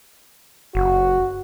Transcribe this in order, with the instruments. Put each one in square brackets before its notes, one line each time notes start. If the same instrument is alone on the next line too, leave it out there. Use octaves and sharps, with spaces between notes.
[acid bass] F#1 [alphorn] F#4